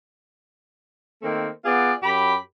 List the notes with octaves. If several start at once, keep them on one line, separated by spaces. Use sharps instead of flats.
D#3 A3 A#3 C4
B3 F4 G#4 D5
F#2 G4 B5